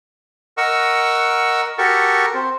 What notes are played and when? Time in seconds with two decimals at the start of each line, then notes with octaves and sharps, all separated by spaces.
0.58 A#4 D#5 F#5 C#6 E6
1.78 F#4 G4 A4 A#4 C#6
2.34 C4